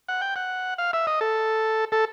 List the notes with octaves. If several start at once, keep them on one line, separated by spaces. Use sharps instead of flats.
F#5
G5
F#5
F5
E5
D#5
A4
A4